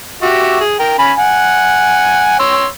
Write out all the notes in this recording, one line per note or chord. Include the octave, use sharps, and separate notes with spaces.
F#4 G4 E5
G#4
A#4 G5
C#4 G#5 B5
F#5 G#5
C#5 C6 E6